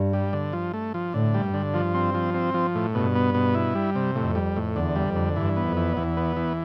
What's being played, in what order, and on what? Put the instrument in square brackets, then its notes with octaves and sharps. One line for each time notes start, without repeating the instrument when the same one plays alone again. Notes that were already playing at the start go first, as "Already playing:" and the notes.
Already playing: [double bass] G2
[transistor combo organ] G3
D3
F3
A3
F3
[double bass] A2 [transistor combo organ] D3
[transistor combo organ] G3
[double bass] G2
[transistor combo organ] D3
F3
C4
F3
C4
F3
A2
[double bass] G2 [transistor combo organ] B2
[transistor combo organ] B3
B2
E4
G3
C3
[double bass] F2 [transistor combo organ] A2
[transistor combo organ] G3
A2
[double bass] E2 [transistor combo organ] D3
[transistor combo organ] G3
[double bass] F2
[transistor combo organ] D3
[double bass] G2 [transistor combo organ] E3
[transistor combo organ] B3
[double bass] F2
[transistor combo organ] E3
[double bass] E2 [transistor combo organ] E3
[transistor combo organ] B3
E3